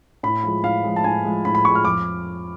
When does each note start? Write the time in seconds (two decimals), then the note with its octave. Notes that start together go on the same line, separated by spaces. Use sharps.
0.23 A2 B5
0.44 F3 G#3
0.64 A2 F5
0.84 F3 G#3
0.96 A5
1.04 A2 G#5
1.25 F3 G#3
1.45 A2 B5
1.55 B5
1.65 F3 C#6
1.70 G#3
1.75 F6
1.85 F2 D6